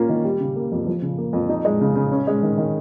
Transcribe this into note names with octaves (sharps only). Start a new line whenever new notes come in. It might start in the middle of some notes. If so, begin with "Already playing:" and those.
Already playing: A#3 C#4 F4
D#3
G3
C#3
A#3
F2
F3
C#3
A#3
F2
D#4
G#3
C#3
C#3
C#4
G#3
D#3
D#3